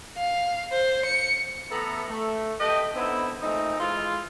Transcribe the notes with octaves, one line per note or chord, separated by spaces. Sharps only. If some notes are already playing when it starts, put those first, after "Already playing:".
F5
C5
C#7
A2 E3 B3 A4 A#5
A3
G4 A4 B4 D#5 G5
D3 B3 C4 D#4 E4
A#2 A3 C4 D#4
E3 G#3 F4